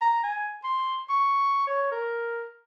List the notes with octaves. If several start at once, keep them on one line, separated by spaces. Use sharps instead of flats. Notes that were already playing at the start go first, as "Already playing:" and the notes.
A#5
G#5
C6
C#6
C#5
A#4